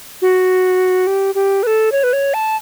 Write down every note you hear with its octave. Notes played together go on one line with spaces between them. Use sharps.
F#4
G4
G4
B4
A4
C#5
B4
C#5
A5